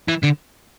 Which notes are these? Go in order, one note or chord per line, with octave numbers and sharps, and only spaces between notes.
E3
D3